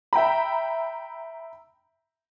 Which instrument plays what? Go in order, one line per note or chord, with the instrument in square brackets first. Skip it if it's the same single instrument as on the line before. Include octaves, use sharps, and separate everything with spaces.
[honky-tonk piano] E5 G5 A#5 B5